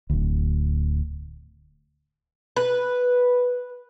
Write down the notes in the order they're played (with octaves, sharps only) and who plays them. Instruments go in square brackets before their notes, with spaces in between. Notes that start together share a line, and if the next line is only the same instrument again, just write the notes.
[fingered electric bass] D1 D2
[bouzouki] B4